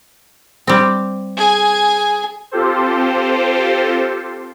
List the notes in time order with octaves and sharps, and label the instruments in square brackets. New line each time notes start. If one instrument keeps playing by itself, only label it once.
[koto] G3 C4
[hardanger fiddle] G#4 G#5
[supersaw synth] C4 F4 G4 A4 C5